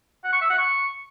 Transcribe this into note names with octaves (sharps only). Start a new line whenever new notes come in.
F#5
C#6
E5
F#5
C#6